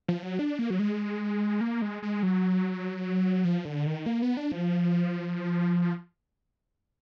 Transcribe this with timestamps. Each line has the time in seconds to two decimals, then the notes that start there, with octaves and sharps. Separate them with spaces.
0.08 F3
0.23 F#3
0.39 D4
0.59 A#3
0.70 F#3
0.79 G#3
1.61 A#3
1.82 G#3
2.03 G#3
2.23 F#3
3.45 F3
3.65 D3
3.86 D#3
4.06 A#3
4.22 B3
4.37 D4
4.52 F3